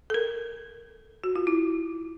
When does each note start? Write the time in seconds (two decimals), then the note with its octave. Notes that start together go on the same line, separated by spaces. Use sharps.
0.10 A4
0.14 A#4
1.24 F#4
1.36 F4
1.47 E4